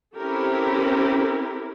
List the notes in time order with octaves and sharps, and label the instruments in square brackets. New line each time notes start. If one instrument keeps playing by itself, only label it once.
[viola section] C4 C#4 E4 G4 A4 A#4